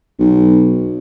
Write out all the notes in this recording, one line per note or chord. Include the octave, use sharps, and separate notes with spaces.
B1